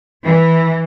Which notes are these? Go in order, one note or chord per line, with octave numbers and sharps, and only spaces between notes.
E3